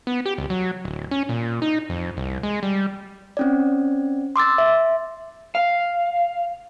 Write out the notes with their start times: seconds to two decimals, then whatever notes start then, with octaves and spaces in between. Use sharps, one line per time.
0.07 B3
0.26 G4
0.38 C#2
0.50 F#3
0.85 D1
1.11 C#4
1.29 A#2
1.62 D#4
1.89 F2
2.17 C2
2.43 G#3
2.63 G3
3.37 C4 C#4 D5
4.36 C6 D6 E6 A6
4.58 E5
5.55 F5